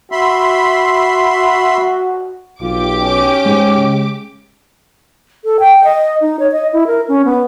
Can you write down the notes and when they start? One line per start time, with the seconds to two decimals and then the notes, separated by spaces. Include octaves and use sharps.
0.12 F#4 E5 B5 C6
2.61 B1 F4 G4 D6
3.02 C#4
3.46 G#2 G#3
3.76 C#3
5.44 A4
5.60 G5
5.84 D#5
6.21 D#4
6.39 C#5
6.52 D#5
6.73 E4
6.87 A#4
7.09 C#4
7.25 B3